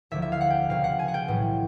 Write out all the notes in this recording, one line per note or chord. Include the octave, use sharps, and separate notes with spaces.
E1 D2 D3 F3 E5
E5
F5
F#5
G5
C#2 B2 F5
F#5
G#5
F#5
G5
B1 A2 E3